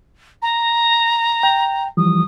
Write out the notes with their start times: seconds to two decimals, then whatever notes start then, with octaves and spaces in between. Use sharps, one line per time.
0.42 A#5
1.43 G5
1.97 E3 F3 G3 D#6